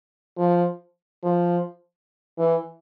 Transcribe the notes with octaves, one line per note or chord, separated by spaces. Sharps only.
F3
F3
E3